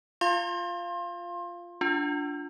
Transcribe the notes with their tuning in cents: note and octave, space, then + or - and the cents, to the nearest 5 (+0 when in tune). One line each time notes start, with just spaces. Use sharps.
F4 +0 F5 -10 C6 +25
D4 -15 F4 +0